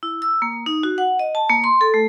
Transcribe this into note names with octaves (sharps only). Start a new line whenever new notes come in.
E4
E6
A#3
D#4
F#4
F#5
D#5
A5
A#3
C6
A4
A3